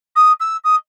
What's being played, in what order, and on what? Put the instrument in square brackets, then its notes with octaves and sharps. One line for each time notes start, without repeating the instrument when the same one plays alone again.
[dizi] D#6
E6
D#6